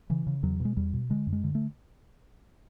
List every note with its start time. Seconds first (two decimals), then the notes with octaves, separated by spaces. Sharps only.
0.10 C#3 E3
0.27 C#3
0.43 E2 F#3
0.60 B2
0.65 G#3
0.77 E2 G3
0.93 B2
1.10 D3 G#3
1.27 F#2
1.33 G#3
1.44 D3
1.55 A3